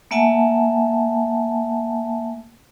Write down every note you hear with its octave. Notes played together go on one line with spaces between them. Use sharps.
A3 A#3 E5 F#5 G#5 A5